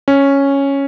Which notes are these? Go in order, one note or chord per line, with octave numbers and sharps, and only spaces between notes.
C#4